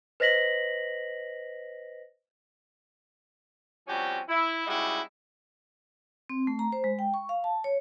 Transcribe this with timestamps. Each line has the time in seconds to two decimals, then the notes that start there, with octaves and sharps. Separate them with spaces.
0.20 B4 C5 D#5 A#6 B6 F#7
3.88 F3 G3 C4 C#4 F#4 G4
4.29 E4
4.67 G3 G#3 C#4 D#4 E4 F#4
6.29 C4
6.47 A3
6.59 A#5
6.72 C5
6.84 G#3
6.99 G5
7.14 C#6
7.29 F5
7.44 A5
7.64 C#5